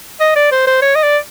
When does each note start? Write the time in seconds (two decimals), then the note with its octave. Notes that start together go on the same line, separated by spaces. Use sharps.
0.20 D#5
0.36 D5
0.52 C5
0.67 C5
0.82 C#5
0.95 D#5
1.03 D5